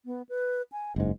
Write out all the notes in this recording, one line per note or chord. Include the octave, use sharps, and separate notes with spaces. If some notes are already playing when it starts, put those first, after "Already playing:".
B3
B4
G#5
F#1 G#2 G#3